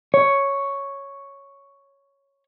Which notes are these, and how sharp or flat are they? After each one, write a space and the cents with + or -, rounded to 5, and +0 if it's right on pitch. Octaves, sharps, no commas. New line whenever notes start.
C#5 +0